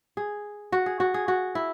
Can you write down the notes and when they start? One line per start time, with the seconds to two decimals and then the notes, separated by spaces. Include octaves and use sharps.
0.17 G#4
0.72 F#4
0.86 G#4
1.00 F#4
1.14 G#4
1.28 F#4
1.55 E4